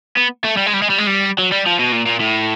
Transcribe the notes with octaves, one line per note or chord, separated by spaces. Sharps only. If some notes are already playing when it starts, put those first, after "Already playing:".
B3
A3
G3
G#3
G3
G#3
G3
G#3
G3
F#3
G3
F3
B2
A#2
A#2
A2